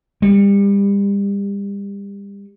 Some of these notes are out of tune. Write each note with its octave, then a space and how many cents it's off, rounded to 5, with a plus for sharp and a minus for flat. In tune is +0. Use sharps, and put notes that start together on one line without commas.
G3 +35